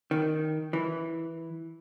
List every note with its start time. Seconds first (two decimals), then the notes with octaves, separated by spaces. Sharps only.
0.11 D#3
0.73 E3